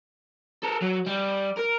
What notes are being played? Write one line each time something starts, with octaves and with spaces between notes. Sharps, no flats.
A4 A#4
F#3
G3
A#4